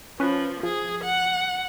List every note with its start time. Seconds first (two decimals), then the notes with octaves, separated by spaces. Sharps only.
0.20 F3 C#4 B4
0.63 F3 G#4
1.04 F#5